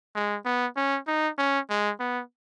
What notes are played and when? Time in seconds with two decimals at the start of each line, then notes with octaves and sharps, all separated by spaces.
0.15 G#3
0.45 B3
0.77 C#4
1.07 D#4
1.38 C#4
1.70 G#3
2.00 B3